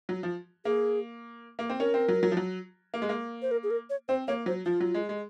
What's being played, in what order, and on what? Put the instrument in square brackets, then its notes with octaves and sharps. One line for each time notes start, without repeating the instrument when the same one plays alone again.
[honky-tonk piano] F#3
F3
[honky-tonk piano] A#3 [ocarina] G#4
[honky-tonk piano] A#3
C4
[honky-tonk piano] C#4 [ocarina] A#4
[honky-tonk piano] C4
F#3
F#3
F3
F#3
A#3
G#3
A#3
[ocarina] C5
A#4
G#4
A#4
C#5
[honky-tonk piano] C4 [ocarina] C5
[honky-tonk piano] A#3 [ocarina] C#5
[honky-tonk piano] F#3 [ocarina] C5
[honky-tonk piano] F3 [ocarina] F4
[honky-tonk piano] F#3
G#3
G#3